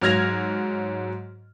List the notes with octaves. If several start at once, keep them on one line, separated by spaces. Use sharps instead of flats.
G#2 F#3 F6 G#6 A#6 F7